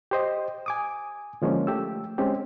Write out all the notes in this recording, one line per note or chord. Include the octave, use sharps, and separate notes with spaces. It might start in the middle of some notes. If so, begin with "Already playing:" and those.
G4 C5 D#5
G#5 D6 D#6
D3 F3 G#3 A#3 C#4
A3 G4 E6
G#3 C4 C#4 G4